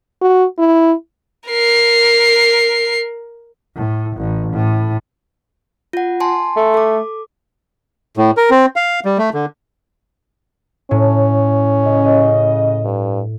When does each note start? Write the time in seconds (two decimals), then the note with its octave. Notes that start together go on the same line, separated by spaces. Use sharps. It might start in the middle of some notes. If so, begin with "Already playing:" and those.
0.21 F#4
0.59 E4
1.49 A#4 C7
3.76 A2
4.17 A1
4.53 A2
5.93 F4 F#5
6.20 G#5 A5 C6
6.57 A3
6.74 A4 D6
8.17 A2
8.37 A#4
8.50 C4
8.76 F5
9.05 G3
9.18 A3
9.34 D3
10.91 A2 C#4
11.85 C#3 D#5
12.85 G2